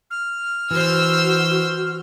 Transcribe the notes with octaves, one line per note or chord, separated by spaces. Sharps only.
F6
E3 F#4 C5 E6